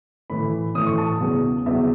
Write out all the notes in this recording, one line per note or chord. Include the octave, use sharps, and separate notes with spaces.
A2 E3 B5
A2 E3 D#6
C#6
A5
E2 C#3 F#3
E2 C#3 F#3 E5